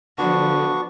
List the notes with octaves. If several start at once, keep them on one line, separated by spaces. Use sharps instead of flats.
D3 F3 B3 D4 F#4 C#6